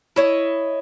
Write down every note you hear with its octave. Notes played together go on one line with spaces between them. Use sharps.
E4 C#5 D#5